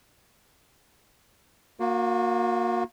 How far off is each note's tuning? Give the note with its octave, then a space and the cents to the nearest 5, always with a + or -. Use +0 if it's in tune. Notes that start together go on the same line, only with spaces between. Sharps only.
A#3 +0 F#4 -40